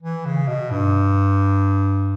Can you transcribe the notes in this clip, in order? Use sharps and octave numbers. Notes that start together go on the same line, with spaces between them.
E3
C#3
B2
G2